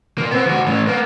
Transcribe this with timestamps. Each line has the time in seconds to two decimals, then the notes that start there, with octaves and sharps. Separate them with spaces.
0.18 A#2 A#3
0.31 B3 C4
0.46 D#2 F#4
0.66 A2 C#4
0.87 A#3 B3